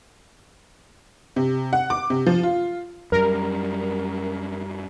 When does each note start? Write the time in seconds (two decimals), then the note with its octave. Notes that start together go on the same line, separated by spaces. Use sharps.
1.36 C3
1.73 F#5
1.90 D6
2.10 C3
2.26 F3
2.43 F4
3.12 F#2 G3 A#4